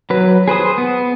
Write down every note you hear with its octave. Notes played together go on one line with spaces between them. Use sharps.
F#3 B4
G#4 B4 C5 D#6
B3